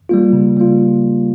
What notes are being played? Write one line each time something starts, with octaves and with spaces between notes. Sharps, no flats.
G3 A#3 F4
C#3
G3 A#3 F4